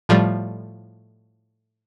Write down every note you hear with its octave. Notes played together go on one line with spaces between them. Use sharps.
A2 F3 G3